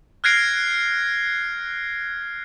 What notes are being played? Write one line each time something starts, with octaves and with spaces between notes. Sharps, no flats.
F6 F#6 G#6 A#6 C7 D7